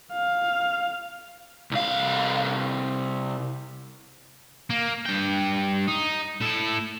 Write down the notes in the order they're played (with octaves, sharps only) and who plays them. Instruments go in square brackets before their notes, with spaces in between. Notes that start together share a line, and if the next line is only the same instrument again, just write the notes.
[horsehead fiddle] F5
[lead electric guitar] C2 F5
[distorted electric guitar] A#3
G2 G5
D#4
A2 A4